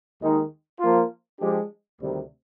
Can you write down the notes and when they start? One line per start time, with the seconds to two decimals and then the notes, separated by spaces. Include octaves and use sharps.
0.19 D#2 D#3 G#3 D#4
0.79 F3 A#3 F4
1.39 F3 G#3 D4 G4
1.99 D2 C3 D#3 G3